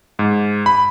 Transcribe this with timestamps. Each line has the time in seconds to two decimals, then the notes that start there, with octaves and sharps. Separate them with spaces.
0.19 G#2
0.66 B5